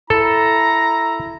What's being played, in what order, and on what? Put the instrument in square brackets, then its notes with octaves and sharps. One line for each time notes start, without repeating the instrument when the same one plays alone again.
[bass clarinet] E4 [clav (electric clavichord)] A4 [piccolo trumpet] A#5